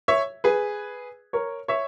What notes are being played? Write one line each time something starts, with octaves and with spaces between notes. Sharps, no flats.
C#5 E5
G#4 B4
A#4 C#5
C#5 E5